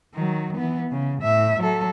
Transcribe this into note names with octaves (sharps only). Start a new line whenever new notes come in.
D#3 F#3
E3 B3
C#3
A2 E5
F#3 A4